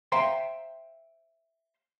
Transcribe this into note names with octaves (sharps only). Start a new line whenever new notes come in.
C5 E5 F5 G5 A#5 C6